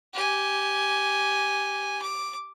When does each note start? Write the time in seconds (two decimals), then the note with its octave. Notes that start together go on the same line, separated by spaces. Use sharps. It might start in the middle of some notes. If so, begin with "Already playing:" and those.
0.14 G4 G#5
2.02 D6